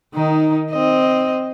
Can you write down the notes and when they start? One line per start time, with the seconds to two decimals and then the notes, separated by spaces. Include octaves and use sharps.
0.15 D#3 D#4
0.72 C4 D#5